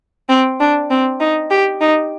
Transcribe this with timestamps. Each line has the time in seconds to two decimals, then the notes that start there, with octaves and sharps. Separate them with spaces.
0.29 C4
0.60 D4
0.90 C4
1.20 D#4
1.51 G4
1.81 D#4